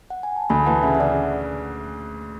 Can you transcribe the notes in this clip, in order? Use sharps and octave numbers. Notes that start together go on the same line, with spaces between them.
F#5
G#5
A5
D2 G#5 B5
E3 F#5 A5
C#3 E5 G#5
E5
C#3 D5 F#5